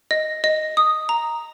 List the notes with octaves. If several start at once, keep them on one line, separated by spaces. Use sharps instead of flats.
D#5
D#5
D#6
A#5